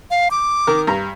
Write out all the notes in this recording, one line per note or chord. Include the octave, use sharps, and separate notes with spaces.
F5
D6
D#3 A#4
G2 A#5